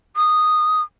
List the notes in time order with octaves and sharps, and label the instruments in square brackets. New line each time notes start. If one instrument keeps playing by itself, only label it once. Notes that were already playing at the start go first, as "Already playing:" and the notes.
[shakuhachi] D#6